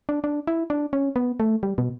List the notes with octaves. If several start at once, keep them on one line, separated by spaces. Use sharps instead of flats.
D4
D4
E4
D4
C#4
B3
A3
G3
B2